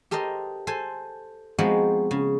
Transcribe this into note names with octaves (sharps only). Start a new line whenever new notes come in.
G4 A4 A#4 C5 D#5
A4 C5 G#5
F3 G#3 B3 C4 D#4 F#4
C#3